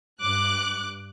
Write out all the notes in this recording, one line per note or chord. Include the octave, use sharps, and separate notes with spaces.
G2 D6 F#6